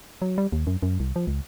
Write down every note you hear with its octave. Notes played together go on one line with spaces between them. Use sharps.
F#3
G3
D#2
F#2
F#2
C2
F3
C#2